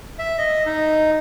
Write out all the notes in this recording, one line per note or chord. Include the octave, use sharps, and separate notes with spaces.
E5
D#5
D#4